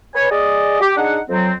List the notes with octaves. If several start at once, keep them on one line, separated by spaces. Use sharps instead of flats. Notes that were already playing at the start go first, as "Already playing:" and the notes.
B4 C#5 G#5
G#4 D5 D#5
G4
D4 D#4 G#4 F#5
F2 F#3 C4